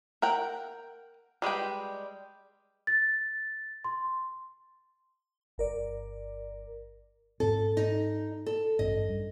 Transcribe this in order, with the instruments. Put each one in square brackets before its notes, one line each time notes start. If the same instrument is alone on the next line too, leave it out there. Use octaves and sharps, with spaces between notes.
[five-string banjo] A#4 F#5 G5
G3 G#3 B4 G5
[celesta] A6
C6
[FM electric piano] G1 A#4 D5
[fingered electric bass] G#2 C4 [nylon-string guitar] A4
[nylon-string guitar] D#4
A4
[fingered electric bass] A1 G2 C#4 [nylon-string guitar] D#5
[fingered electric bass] G2